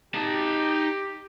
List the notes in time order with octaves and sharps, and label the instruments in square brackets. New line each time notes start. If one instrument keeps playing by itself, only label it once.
[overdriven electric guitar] D#4 A5 [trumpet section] G4